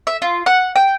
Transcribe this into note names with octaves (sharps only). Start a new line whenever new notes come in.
E5
F4
F#5
G5